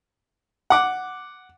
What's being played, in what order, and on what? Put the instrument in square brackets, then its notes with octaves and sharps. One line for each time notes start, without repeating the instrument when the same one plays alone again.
[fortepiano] F#5 D6